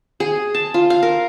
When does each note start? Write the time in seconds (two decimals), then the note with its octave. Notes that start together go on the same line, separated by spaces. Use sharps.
0.20 G#4
0.54 A5
0.74 F4
0.90 F5
1.03 A#4